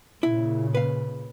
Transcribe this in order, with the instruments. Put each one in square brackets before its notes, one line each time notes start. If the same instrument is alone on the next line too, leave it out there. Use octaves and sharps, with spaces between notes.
[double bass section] A#2 C#3 [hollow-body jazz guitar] E4
[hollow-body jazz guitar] B4 F5